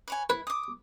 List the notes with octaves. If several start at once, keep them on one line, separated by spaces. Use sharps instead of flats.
B4 C#5 G#5
E4 B4
D6 D#6